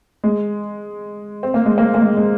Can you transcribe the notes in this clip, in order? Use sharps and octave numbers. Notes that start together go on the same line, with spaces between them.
G#3
C4
A#3
G#3
A#3
A#3
G#3
G#3